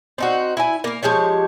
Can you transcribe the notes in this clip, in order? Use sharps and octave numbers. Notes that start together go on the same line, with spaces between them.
C4 D#4 F#4
E4 G#5
A#3 A#4
F3 G#3 G4 C#5